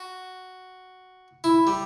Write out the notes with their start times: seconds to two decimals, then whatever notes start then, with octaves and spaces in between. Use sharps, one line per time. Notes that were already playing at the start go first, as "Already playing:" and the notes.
Already playing: F#4
1.44 E4
1.67 G3